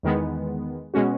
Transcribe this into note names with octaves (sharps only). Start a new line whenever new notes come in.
E2 D#3 G#3 B3
B2 G#3 C#4 F#4